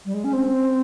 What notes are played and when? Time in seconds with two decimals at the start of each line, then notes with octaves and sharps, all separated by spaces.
0.06 G3
0.14 G#3
0.24 C#4
0.33 C4